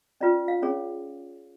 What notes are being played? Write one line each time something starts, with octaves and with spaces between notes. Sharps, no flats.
C#4 F4 B4 D5
F5
C#4 G#4 C#5